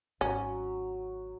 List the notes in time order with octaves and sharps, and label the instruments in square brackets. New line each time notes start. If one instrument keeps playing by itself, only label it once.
[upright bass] G#1 [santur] F#3 [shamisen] C#4